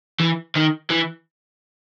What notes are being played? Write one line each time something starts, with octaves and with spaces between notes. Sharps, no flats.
E3
D#3
E3